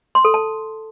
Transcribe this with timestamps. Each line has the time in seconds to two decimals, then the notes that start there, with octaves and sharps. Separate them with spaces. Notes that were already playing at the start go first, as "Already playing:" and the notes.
0.15 C6
0.25 A4
0.34 A5